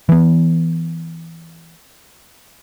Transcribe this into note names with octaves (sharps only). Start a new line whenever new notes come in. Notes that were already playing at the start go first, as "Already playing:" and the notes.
E3 B3